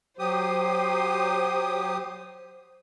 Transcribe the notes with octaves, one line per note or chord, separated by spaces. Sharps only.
F#3 G4 C5 D#6